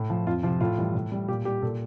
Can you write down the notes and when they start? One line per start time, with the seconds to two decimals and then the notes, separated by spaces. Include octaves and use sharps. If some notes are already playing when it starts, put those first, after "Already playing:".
Already playing: A2
0.10 F3
0.27 F2 F4
0.43 C3 F3 F4
0.60 A2 F4
0.78 E3 G3
0.95 A2
1.12 G3
1.28 A#2 G4
1.45 G3 G4
1.62 A#2 A4